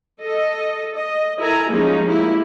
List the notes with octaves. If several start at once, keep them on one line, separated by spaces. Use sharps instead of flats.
A4 D#5
D#5
E4 A4 A#4 G#5 A#5
F3 G3 G#3 A#3 C#4 D#4
A#3 E4 G4